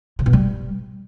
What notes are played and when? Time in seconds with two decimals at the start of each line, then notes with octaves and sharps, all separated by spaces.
0.19 C#3
0.26 B2
0.33 G3